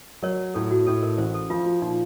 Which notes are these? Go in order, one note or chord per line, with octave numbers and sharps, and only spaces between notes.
F#3 A#4 C#5
A2 A4
F#4
A2 A4
A#4
A1 C5
A4
F3 F4
F4
A#2 D#4